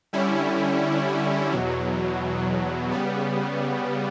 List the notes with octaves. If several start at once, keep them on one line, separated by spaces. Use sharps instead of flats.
D3 G3 C#4 E4
E2 B2 F#3
C#3 G3 B3